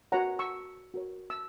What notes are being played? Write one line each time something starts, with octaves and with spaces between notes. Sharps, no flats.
F#4 A#4 C#5 F#5 A#5
C#6 E6
F#4 A#4 C#5
E6